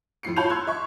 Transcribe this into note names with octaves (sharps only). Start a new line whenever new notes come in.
F2 A2 C7 C#7
F4 C#5 A5 B5 G6 F7
C6 E6 F#6 G#6
E5 C#6